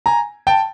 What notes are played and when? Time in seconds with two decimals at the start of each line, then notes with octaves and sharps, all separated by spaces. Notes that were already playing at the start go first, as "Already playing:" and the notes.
0.06 G#5 A#5
0.47 G5 A5